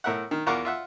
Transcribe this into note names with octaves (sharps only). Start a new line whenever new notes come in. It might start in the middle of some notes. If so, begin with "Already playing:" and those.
A2 A#4 E5 F#5
D#3
E2 F4 A#4 F#5 C#6 D6
F4 E5 F#5